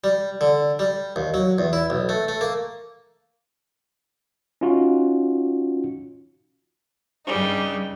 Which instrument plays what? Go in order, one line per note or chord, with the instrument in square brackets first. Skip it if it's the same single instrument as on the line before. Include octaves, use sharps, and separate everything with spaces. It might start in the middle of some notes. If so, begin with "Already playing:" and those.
[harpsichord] G3
D3
G3
D#2
F#3
E2
E4
B1
A3
A3
A#3
[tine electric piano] C#4 D#4 F4 F#4
[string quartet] G2 C#3 G3 D#4